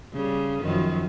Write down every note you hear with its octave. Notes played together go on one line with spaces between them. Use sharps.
C#3 G3
F#2 D#3 F3